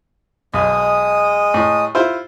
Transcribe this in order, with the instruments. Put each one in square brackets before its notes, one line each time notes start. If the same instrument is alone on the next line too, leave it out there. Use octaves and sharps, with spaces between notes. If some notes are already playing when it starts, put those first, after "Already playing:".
[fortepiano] B1 [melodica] G#3 D#6
[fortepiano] A2
E4 F4 C5